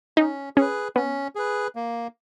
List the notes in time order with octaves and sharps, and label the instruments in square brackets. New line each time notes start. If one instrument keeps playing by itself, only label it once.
[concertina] C#4 [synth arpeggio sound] D#4
[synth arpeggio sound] C#4 [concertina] G#4 B4
[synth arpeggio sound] B3 [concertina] C#4
[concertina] G#4 B4
A#3